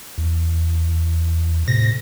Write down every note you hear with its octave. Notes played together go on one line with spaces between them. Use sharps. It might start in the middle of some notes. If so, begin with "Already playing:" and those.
E2
A2 C3 A#6